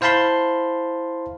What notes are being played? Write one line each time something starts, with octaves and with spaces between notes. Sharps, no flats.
E4 C5 F5 A5 B5 C6